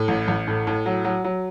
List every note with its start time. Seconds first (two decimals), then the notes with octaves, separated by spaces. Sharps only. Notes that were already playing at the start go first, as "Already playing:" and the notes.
Already playing: A2
0.08 A1
0.28 A1
0.48 A2
0.67 A2
0.86 F#3
1.05 F#3
1.24 F#3